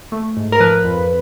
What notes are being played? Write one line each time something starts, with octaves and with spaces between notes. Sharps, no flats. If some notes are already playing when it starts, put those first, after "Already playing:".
A3
G#2
A#4
F3 B4
F2